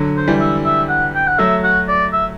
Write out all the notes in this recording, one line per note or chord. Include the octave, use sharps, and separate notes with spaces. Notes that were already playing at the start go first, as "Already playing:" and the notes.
Already playing: D3 F#3
C5
E3 G3
E5
E5
F#5
G5
F#5
F#3 A3 E5
F#4
D5
E5